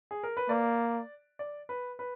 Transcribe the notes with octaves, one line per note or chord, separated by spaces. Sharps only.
G#4
A#4
B4
A#3 D5
D5
B4
B4